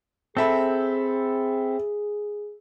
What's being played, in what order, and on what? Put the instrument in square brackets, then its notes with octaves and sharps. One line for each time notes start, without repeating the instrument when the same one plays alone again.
[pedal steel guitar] C4 [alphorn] G#4 [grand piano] A4 E5 B5